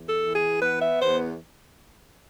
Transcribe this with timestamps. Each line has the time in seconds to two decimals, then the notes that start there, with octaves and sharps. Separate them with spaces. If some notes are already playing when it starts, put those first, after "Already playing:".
Already playing: E2
0.09 A4
0.22 E3
0.35 G#4
0.62 B3 B4
0.81 E5
1.01 E2 C5